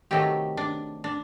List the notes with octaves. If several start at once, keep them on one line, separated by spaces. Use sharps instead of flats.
C3 D#3 F#3 A3 G4
D4
D4